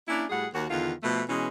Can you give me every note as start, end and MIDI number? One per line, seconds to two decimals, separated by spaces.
0.08 0.25 58
0.08 0.25 61
0.08 0.25 62
0.08 0.25 64
0.30 0.47 45
0.30 0.47 55
0.30 0.47 66
0.30 0.47 68
0.30 0.47 78
0.54 0.65 39
0.54 0.65 66
0.69 0.92 40
0.69 0.92 50
0.69 0.92 51
0.69 0.92 65
1.03 1.22 47
1.03 1.22 53
1.03 1.22 57
1.29 1.48 47
1.29 1.48 52
1.29 1.48 56
1.29 1.48 61